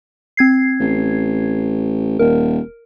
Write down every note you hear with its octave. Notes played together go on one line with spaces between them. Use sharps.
C4 G#6 C7
A1
D#1 A#4